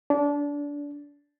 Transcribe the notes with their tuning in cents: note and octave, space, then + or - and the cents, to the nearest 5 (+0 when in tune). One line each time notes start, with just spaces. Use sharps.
D4 -25